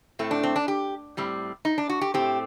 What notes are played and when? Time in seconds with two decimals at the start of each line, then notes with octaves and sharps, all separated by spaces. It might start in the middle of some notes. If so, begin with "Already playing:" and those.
0.19 A2 A3 C4
0.31 D4
0.43 C4
0.56 D4
0.68 G4
1.17 A2 G3 C4
1.65 D#4
1.78 D4
1.89 F#4
2.01 G4
2.14 A2 A3 C4 G4